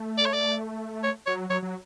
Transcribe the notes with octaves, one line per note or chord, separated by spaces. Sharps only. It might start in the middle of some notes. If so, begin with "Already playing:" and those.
Already playing: A3
D5
C#5
D5
C#5
F#3 C#5
F#3 C#5
F#3